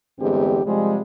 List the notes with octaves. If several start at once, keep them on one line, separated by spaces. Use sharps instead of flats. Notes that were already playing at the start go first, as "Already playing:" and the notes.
E2 G2 D3 G#3 C4 G4
C3 F3 G3 G#3